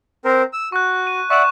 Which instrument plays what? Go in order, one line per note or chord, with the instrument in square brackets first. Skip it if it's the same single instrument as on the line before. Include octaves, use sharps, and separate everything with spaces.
[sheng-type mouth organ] C4 A#4 C5
E6
[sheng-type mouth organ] F#4 [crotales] C#6 F#6
[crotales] D#7
[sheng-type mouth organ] D5 E5 F#5 [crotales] C#6 E7